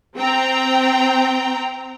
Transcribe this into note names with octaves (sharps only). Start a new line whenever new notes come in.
C4 G5 A#5